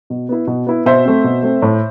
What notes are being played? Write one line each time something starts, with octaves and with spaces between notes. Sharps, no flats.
B2
B3 E4
B2
B3 E4
B2 C5 E5
A3 C4
B2
A3 C4
A2